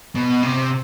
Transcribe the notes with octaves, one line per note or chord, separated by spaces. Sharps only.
B2
C3